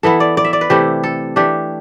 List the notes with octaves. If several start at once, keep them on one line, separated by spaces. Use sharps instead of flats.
E3 B3 E4 A4
D5
D5
E5
D5
B4
C3 E3 A3 E4 G4
A4
E3 A3 D4 G4